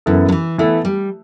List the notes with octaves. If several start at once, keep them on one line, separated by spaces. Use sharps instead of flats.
F#2 E3 B3 E4 A4
F#3
E3
E3 A3 B3 E4 A4
G3